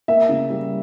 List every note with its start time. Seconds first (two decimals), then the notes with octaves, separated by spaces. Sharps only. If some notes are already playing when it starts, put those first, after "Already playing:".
0.08 A#3 E5
0.29 C#3
0.50 G3